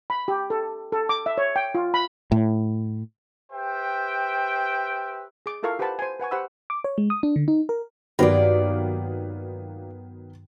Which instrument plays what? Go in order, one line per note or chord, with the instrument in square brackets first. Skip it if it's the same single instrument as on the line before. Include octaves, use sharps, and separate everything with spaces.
[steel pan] B5
G4
A4
A4
D6
E5
C#5
G5
F4
B5
[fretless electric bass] A2
[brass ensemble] G4 B4 C5 E5 G5
[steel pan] G#4 D6
E4 F4 A4 A#4 F5 C#6
G4 B4 C5 F#5 A5 B5
C5 G#5
B4 F#5 G#5 C#6
G4 C5 F#5 B5 C#6 E6
[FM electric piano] D6
C#5
G#3
D#6
D4
D3
D#4
A#4
[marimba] G2 [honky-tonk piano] D#3 F#3 B3 [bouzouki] A#3 F4 D5